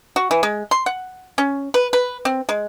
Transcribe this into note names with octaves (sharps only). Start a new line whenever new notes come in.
F#4
E3
G#3
C6
F#5
C#4
B4
B4
C4
G#3